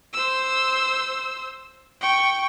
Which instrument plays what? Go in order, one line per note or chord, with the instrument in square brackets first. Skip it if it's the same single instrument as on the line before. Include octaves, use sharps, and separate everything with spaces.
[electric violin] C5 E6
G5 C#6